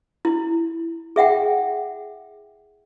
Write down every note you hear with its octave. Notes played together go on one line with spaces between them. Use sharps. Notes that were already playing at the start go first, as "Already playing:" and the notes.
E4
G#4 E5 F#5 G5